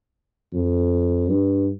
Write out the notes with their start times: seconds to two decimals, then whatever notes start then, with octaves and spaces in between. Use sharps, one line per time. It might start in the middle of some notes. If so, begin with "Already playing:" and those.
0.53 F2
1.28 G2